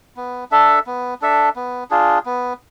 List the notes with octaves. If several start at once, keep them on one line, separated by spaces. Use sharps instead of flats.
B3
D4 A4 E5
B3
D4 A4 E5
B3
D4 F4 G#4
B3